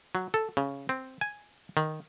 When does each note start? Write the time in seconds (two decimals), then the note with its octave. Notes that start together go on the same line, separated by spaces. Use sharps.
0.15 F#3
0.34 A4
0.57 C#3
0.89 C4
1.21 G#5
1.77 D#3